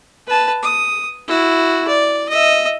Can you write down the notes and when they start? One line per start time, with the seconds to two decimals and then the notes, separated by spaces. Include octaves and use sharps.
0.27 B4 A5
0.63 D#6
1.28 E4 F#4
1.87 D5
2.29 D#5 E5